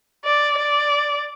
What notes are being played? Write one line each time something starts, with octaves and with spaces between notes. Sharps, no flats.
D5
D5